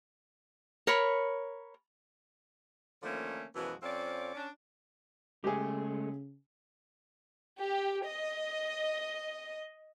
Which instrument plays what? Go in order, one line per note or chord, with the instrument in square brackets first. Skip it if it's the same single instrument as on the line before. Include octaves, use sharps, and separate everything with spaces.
[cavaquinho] A#4 C#5 B5
[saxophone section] D3 D#3 F3 A3 A#3 C#4
F#2 B2 E3 F3 G#3 F#4
F2 F3 C4 C#4 D5
C#4 D4
[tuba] C#3 [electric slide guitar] G#3 A3 [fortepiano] G4 G#4
[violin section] G4
D#5